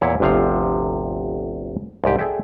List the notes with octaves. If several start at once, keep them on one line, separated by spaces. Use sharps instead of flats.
E2 A#2 E4 C#5
G1 D2 C3 F3 F5
C2 G#2 G4
G#4 A4 D5 E5 G5